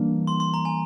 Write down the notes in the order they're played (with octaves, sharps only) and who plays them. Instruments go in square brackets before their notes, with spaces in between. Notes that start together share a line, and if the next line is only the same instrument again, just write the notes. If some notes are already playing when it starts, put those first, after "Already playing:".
Already playing: [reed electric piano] E3 G3 A#3 D4
[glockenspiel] C6
C6
A#5
G#5